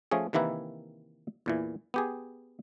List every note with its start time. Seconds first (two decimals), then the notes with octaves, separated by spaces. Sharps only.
0.11 F3 A3 C#4 G#4
0.33 C3 D#3 E3 A#3 E4 B4
1.46 E2 A#2 E3
1.94 B3 G4 G#4